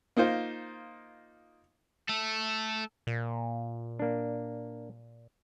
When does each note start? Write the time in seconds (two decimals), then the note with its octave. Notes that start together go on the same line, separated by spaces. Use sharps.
0.17 A#3 D#4 F4 C5
2.09 A3 A4
3.07 A#2
3.99 A#3 D4